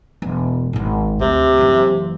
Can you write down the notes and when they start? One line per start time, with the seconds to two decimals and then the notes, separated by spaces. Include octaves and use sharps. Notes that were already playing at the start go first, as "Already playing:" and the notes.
0.22 E1
0.73 G#1 G#2
1.21 D2 C3
1.58 F#1 E3